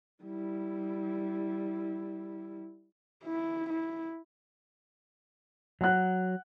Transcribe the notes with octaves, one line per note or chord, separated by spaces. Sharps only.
G3 E4
E4
E4
F#3 F#5 F#6